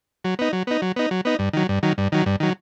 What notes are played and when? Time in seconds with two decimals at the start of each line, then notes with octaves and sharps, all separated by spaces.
0.24 F#3
0.39 B3 D#4
0.53 F#3
0.67 B3 D#4
0.82 F#3
0.96 B3 D#4
1.11 F#3
1.25 B3 D#4
1.39 G2
1.53 D#3 F#3
1.69 G2
1.83 D#3 F#3
1.98 G2
2.12 D#3 F#3
2.26 G2
2.40 D#3 F#3